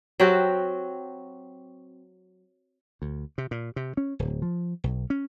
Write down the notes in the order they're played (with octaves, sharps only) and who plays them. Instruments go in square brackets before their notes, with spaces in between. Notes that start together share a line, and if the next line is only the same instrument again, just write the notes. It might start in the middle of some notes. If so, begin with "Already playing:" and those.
[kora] F#3 C4 F#4 G4
[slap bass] D2
C3
A#2
C3
C#4
D1
F3
B1
C#4